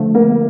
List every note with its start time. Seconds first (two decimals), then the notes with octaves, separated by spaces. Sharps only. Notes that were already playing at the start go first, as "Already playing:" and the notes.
Already playing: D3 F3 A3
0.15 A#3